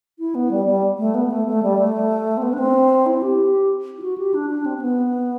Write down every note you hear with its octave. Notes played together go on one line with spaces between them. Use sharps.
E4
B3
G3
G3
A3
B3
A3
A3
G3
A3
C4
B3
D4
C4
E4
G4
E4
F#4
G4
D4
D4
C4
C4
B3